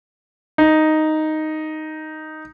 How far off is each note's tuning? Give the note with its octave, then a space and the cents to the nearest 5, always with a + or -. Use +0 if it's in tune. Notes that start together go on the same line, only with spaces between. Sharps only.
D#4 +0